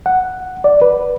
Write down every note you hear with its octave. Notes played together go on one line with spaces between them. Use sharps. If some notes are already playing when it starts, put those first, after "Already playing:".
F#5
D5
B4